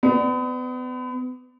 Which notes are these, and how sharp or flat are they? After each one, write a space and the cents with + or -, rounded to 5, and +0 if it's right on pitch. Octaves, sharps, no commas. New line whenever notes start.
B3 +35 D5 +15